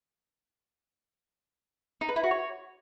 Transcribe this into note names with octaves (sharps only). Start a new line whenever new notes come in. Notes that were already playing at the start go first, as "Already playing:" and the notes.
D#4
B4
E4
F#4
C#5